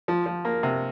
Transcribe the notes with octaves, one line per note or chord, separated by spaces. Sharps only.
F3
F3
A#3
C3